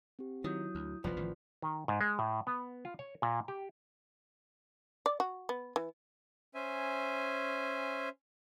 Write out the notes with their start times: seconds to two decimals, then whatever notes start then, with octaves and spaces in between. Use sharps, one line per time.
0.19 C4 G4
0.44 D#3 F#3 E4 D#6 G6
0.75 D2
1.04 F1 B1 B2 F3 B3 D5
1.17 A1 D#3 E3
1.62 D#3
1.88 G#2
2.01 G#3
2.19 A2
2.47 B3
2.85 F4
2.99 C#5
3.22 A#2
3.48 G4
5.06 D5
5.20 F#4
5.49 B3
5.76 E3
6.55 C#4 C5 E5 G#5